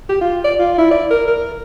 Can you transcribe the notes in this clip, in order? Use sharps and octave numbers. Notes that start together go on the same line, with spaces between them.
G4
F4
D5
F4
E4
D5
A#4
A#4